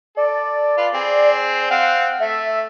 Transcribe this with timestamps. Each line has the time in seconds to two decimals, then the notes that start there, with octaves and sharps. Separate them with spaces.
0.17 A4 D5
0.78 F4 B4
0.94 C4 G#4 C5
1.71 C4 F5 F#5
2.20 A3 E5